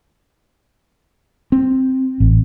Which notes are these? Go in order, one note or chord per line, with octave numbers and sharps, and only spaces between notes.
C4
A1